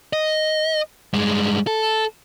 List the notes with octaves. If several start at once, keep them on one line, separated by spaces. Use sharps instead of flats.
D#5
G2 G#3
A4